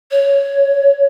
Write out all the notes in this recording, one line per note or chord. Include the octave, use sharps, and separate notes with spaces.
C#5